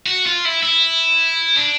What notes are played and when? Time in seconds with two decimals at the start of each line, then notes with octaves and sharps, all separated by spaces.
0.07 F#4
0.26 F4
0.45 E4
0.63 E4
1.56 D4